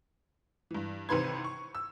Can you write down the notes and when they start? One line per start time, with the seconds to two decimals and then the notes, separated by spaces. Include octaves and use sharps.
0.71 G2 E3
1.09 A1 C3 D#3 B4 C6 G#6
1.44 C#6
1.75 E6